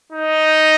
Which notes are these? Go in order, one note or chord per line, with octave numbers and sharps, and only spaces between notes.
D#4